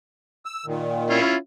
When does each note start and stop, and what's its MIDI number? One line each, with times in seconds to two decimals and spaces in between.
0.46 0.66 88
0.66 1.19 46
0.66 1.19 51
1.10 1.34 61
1.10 1.34 64
1.10 1.34 65